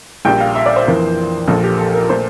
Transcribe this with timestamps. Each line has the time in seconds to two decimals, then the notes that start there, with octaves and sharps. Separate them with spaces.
0.25 A#1 A#2 G3 G5
0.40 F5
0.55 E5
0.66 D5
0.76 C5
0.87 F2 E3 A#3
1.48 A#1 A#2 F3 A#3 A4
1.63 G4
1.79 A4
1.94 A#4
2.09 A#2 A3 C5